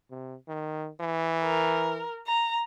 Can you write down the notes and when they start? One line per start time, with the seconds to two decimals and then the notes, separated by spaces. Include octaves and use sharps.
0.11 C3
0.48 D#3
1.01 E3
1.43 A#4
2.27 A#5